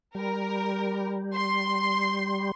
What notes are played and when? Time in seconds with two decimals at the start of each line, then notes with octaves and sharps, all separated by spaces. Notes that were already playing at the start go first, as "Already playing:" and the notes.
0.15 G3 A#4
1.35 C6